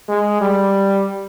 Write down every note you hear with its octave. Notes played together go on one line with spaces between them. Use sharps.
G#3
G3